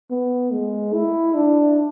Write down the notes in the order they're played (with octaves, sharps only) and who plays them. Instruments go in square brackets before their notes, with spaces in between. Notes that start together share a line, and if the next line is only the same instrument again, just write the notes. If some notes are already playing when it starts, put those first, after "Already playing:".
[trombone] B3
G#3
E4
D4